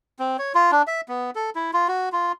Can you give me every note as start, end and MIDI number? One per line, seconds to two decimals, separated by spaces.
0.19 0.37 60
0.39 0.53 73
0.55 0.71 65
0.71 0.82 62
0.87 1.01 76
1.09 1.31 59
1.35 1.50 69
1.55 1.71 64
1.73 1.88 65
1.88 2.09 66
2.12 2.32 65